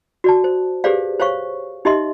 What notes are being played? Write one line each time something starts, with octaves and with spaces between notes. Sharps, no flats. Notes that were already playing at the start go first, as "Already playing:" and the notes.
F#4 D5 A5
C5
G4 G#4 B4 C5 D5 F5
C5 C#5 F5 C#6
D#4 G4 D#5 E5 C6